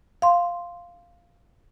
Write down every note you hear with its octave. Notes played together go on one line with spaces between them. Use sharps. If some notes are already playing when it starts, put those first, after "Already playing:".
F5 C6